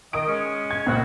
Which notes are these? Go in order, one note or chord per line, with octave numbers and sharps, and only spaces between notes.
D#3 D#5 D#6 D7
G#3 C#4
G#6
C#2 A#2 C4 F#4